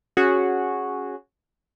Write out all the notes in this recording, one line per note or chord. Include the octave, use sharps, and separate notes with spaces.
C#4 F#4 G#4